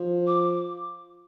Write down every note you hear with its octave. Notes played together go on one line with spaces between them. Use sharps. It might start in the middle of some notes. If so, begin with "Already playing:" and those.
Already playing: F3
D6